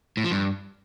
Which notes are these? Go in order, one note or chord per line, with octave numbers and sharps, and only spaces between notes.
A2
F3
G2